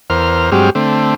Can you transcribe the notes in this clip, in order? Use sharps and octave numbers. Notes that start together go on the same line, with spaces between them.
E2 A#4 C5 F6
G2 F#3 G#3 C4 G4 F6
D3 A3 C4